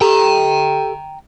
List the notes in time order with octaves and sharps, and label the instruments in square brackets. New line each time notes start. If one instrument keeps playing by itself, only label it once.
[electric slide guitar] G4 A4 [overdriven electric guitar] G5 A#5